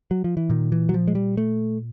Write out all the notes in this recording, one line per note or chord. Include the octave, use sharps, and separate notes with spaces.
F#3
F3
E3
A#2 D#3
E3
F#3
F3
G#3
G3
A3